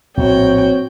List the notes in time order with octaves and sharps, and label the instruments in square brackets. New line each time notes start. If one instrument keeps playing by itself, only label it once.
[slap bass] A#1 A2 [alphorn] C4 [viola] F#4 G5 [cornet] C#5